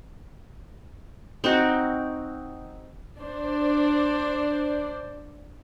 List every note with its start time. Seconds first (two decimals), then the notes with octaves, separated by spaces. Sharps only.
1.44 C4 D#4 F#4
3.19 D4 C5 D5